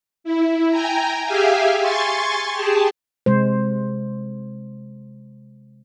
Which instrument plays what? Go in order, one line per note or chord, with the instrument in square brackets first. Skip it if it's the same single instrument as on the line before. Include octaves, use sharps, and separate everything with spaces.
[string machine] E4
G5 G#5 A#5
G4 G#4 E5 F5 G#5
G#5 C6 C#6 A6
G4 G#4 A5
[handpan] C3 G#3 C5